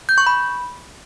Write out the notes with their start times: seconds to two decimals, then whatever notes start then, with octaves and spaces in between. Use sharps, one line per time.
0.09 G6
0.18 C#6
0.27 B5